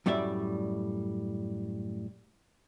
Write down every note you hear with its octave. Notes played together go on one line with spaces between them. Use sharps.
F#2 A2 G3 A3 D5 E5